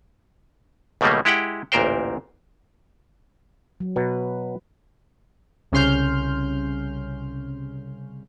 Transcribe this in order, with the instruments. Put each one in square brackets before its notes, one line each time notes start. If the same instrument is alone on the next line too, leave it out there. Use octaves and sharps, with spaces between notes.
[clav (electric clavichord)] C#2 B2 D#3 G3 A3 A#3
G#3 E4 G4 F#5 G5
A1 D2 A#2 A#4 C5 G5
[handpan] F#3
[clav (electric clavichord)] B2 F#3 [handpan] B4
[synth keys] C2 C#3 C#4 C6 F6 G6